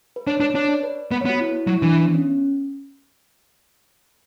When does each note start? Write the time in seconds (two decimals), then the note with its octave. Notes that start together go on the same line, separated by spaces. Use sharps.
0.16 B4
0.27 D4 C#5
0.40 D4 B4
0.55 D4 C#5
0.69 D5
0.83 B4
1.11 B3 B4
1.21 C#5
1.25 B3 F#4
1.40 E4
1.67 F#3 E4
1.81 E3 D4
2.05 B3
2.14 C#4